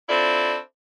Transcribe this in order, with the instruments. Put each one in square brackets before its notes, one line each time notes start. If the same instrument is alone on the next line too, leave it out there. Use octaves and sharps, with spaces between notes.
[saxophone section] C4 D4 E4 F4 A4